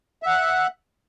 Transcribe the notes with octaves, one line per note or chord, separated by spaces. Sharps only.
E5 F#5 F#6